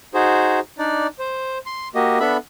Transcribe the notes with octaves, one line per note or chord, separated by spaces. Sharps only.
D#4 F#4 G#4 C5
D4 D#4 D5
C5
C6
A#3 F#4 G4 D#5
B3 D4 A4 E5 B5